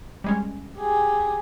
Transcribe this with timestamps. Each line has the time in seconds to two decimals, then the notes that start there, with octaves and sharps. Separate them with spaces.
0.24 G3 G#3 C#4
0.78 G4 G#4